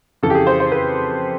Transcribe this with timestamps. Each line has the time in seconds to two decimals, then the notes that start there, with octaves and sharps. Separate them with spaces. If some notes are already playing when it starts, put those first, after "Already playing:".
0.23 F2 C#3 E3 A4
0.30 G4
0.35 G#4
0.47 C5
0.60 C5
0.72 B4